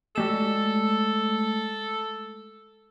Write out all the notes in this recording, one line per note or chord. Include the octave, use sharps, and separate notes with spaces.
G#3 A3 A4 E7